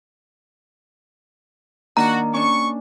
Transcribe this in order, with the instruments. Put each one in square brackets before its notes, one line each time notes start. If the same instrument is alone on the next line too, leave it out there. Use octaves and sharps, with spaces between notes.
[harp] D#3 A#3 D4 [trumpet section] F#4 [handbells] A#5
[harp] C#4 D4 [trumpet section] C#6